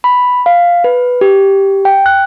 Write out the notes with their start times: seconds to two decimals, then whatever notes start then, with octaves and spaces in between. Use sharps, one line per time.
0.04 B5
0.46 F5
0.84 B4
1.21 G4
1.85 G5
2.06 F#6